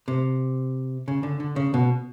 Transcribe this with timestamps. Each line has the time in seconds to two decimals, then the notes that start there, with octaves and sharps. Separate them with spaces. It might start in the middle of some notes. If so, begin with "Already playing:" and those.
0.08 C3
1.08 C#3
1.23 D3
1.40 D3
1.56 C#3
1.74 B2